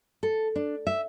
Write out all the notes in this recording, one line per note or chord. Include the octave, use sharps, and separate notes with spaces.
A4
D4
E5